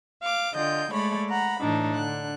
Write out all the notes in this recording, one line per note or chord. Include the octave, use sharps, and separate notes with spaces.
F5 D6
D3 F4 D#5 G5 G6
G#3 A3 C#5 D5 B5
F#5 A#5 B5
A2 E3 D4 D#4
D3 F#6